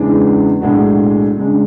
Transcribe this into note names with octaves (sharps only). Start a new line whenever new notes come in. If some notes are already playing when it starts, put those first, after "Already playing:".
Already playing: E2 C#3 E3 G#3 D4
B1 A2 G#3 D4 F#4
C#3 G#3 D4